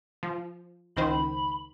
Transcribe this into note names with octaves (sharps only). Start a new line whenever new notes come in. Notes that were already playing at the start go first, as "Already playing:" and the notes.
F3
C#2 D#3 C5 B5